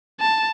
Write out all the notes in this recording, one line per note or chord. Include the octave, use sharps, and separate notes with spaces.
A5